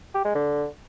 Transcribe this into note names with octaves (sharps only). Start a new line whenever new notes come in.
G4
G#3
D3